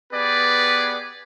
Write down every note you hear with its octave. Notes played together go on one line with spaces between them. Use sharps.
B3 G4 G#4 B4 D5